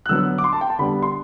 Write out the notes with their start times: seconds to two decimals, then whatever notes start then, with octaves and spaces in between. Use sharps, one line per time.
0.06 F#6
0.09 D3 F#3 B3 E6
0.38 D6
0.44 C6
0.53 A5
0.61 G5
0.70 A5
0.79 D3 G3 B3 B5
1.03 C6